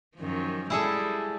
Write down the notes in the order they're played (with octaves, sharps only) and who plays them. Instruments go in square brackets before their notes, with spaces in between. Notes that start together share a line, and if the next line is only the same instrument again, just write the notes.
[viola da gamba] F#2 D#3 F3
[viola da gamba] G3 G#3 [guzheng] E4 G#4 A4